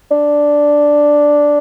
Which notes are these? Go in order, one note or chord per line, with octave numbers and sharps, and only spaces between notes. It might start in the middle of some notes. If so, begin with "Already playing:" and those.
D4